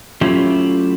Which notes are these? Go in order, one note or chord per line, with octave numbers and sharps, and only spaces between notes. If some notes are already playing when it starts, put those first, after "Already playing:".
F#3 A3 C#4 E4 F4 G4